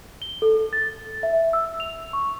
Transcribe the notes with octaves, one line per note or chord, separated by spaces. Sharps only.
G7
A4
A6
E5
E6
F7
C#6